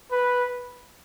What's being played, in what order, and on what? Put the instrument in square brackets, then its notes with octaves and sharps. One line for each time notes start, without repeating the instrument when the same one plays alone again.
[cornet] B4